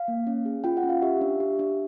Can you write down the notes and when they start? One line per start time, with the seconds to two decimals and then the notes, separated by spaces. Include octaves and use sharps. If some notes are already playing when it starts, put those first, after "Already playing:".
Already playing: F5
0.08 A#3
0.27 C#4
0.46 G#4
0.64 F4 G5
0.77 F#5
0.84 C#4
0.89 F5
1.02 G4 E5
1.21 D4
1.40 G4
1.59 D4